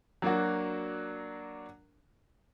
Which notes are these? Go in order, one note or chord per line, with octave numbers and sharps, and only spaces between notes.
F#3 A#3 D4 F#4